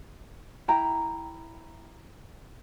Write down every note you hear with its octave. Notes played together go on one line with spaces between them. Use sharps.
E4 G5 A#5